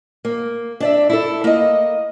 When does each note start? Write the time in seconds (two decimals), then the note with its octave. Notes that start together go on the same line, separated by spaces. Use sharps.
0.25 A#3
0.80 D4 D5 E5
1.10 E4 A4
1.44 A#3 D#5